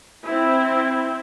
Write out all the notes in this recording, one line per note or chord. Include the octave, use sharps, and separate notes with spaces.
C4 E4